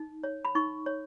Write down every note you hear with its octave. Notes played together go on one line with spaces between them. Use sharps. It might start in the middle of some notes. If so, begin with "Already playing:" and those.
Already playing: D#4
C#5
B5
D#4 C#6
C#5